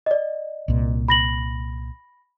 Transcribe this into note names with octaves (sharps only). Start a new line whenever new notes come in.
D5 D#5
C2 A#2
B5 A#6 F#7